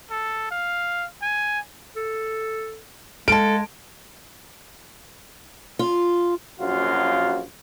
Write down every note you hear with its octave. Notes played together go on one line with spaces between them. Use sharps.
A4
F5
G#5
A4
G#3 A4 F5 A5 D7
F4
A#1 F#2 A#3 F4 F#4